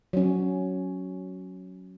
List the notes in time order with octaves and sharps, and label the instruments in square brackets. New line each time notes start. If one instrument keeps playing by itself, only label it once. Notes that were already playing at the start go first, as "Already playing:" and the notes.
[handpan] F#3 C#4